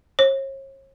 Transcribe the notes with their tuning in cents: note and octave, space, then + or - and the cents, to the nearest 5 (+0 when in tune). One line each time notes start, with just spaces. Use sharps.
C#5 -40